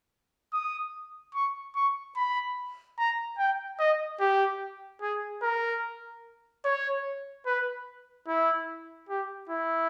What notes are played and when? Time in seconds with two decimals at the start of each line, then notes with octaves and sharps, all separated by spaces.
0.53 D#6
1.35 C#6
1.76 C#6
2.16 B5
2.98 A#5
3.38 G5
3.79 D#5
4.20 G4
5.02 G#4
5.42 A#4
6.65 C#5
7.46 B4
8.28 E4
9.09 G4
9.50 E4